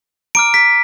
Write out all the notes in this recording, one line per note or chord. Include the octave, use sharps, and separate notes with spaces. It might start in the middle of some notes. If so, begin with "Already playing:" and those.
A#5 D6 F6 D7
B6